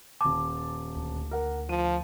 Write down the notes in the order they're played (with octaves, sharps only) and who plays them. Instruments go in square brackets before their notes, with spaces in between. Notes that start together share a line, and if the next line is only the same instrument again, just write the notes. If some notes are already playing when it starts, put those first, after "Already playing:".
[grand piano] D#1 A5 [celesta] D6
[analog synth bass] D2
[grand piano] A#4 F#5
[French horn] F3 [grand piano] D#7